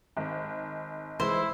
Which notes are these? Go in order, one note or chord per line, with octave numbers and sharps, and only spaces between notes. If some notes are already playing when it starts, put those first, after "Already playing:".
G#1
C2 E3 G#3 E4 C5